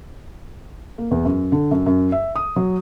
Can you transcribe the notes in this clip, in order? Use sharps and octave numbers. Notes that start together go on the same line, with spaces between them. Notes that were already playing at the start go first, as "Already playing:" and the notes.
A#3
E2
F#2
D3
F#2
F#2
E5
D#6
F#3